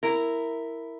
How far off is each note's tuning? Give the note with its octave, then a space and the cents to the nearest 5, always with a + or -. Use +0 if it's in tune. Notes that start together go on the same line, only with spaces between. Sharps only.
E4 +0 A#4 -10